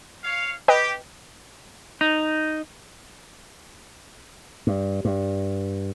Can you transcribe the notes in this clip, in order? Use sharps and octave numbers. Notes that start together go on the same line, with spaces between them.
C#5 F5
G4 B4 D#5 G5
D#4
G2
G2